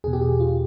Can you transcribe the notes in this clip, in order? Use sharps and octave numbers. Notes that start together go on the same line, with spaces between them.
E2 B2 G#4
G4
G#4
F4